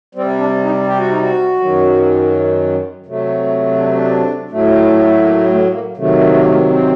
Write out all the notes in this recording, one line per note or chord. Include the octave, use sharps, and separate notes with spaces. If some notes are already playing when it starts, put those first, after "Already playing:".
C3 G3 C4
D4
D#4
G4
F#4
D#4
F#4
F#2 D#3 F#3
C3 F#3 A3
D4
C4
D4
A2 F#3 A3
A#3
A3
A#3
C3 D#3 F#3 A3
A#3
A3
A#3
C4